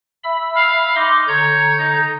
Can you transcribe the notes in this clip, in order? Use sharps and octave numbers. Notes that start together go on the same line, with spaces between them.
E5 B5 E6
F5
D#4 C6 D6
D3 C#5 A#5 G6
D#4